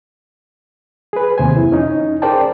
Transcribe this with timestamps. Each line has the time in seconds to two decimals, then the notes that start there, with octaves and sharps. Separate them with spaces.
1.13 G#4 B4
1.38 D#2 C3 C5 G#5
1.56 F2 E4
1.72 C#4 D#4
2.22 G#4 A#4 C5 D5 G5 A5